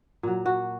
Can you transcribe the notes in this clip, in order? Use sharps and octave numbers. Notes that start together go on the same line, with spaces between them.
A#2 F#3
F#4